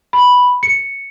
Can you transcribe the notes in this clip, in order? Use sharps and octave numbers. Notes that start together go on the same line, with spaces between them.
B5
C#7